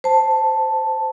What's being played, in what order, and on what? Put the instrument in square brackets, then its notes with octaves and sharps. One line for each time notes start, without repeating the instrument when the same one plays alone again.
[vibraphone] C5 A5